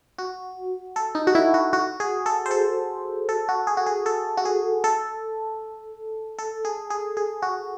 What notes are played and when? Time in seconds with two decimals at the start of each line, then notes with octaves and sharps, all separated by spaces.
0.18 F#4
0.96 A4
1.15 D#4
1.27 F#4
1.35 E4
1.54 F#4
1.73 F#4
2.00 G#4
2.26 A4
2.46 C5
2.51 A4
3.29 A4
3.49 F#4
3.67 G#4
3.77 F#4
3.86 G#4
4.06 A4
4.37 F#4
4.45 G#4
4.84 A4
6.39 A4
6.65 G#4
6.90 G#4
7.17 G#4
7.42 F#4